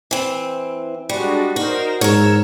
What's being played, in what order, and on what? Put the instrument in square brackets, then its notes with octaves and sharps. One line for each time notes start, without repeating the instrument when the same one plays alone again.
[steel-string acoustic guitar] E3 C4
[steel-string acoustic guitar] G3 [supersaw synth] G#3 D4 F#4
[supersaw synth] D#4 A#4 C5 [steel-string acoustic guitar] F#4
[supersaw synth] E2 E6 [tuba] G#2 [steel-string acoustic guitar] A#4 C#5